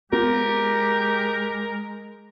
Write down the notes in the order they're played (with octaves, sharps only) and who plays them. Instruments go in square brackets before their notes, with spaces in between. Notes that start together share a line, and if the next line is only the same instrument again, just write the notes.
[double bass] G#3 [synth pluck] B3 F4 [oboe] G4 [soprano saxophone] A#4